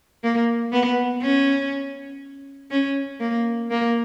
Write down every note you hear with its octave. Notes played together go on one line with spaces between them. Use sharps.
A#3
B3
C#4
C#4
A#3
A#3